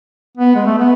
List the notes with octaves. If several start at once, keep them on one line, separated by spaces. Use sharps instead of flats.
B3
G#3
A3
B3